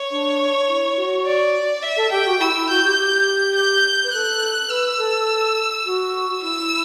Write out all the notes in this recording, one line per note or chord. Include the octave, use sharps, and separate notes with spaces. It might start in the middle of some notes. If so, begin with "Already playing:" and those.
Already playing: C#5
D4
E4
F#4
D5
E5
A4
G4 G5
F#4
E4 E6
E4
F#4 G6
G4
G4
G6
B4
A4 F#6
B4 E6
A4
F#4
E4 E6